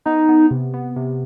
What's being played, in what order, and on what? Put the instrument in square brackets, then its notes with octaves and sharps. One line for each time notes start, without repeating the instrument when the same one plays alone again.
[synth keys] B3 [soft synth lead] D#4
[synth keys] B3
C3
B3
C3